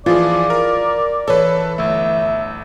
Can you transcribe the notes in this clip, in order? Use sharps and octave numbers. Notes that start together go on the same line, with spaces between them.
E3 F3 F4 G#4 D5
A#4
E3 A4 B4 C#5
G1 A3 E5